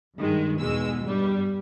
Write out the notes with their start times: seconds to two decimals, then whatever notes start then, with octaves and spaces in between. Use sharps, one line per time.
0.18 G2 D#3 G#3
0.60 E2 B2 G#3 E6
1.04 G2 G3